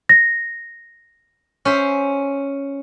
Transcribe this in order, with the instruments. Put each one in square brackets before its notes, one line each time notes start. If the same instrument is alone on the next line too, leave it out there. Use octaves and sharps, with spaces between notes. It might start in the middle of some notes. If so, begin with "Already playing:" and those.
[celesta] A#6
[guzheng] C#4 C5 E5